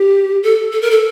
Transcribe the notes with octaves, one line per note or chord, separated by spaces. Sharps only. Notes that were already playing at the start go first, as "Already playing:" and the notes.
Already playing: G4
A4
A4
A#4
A4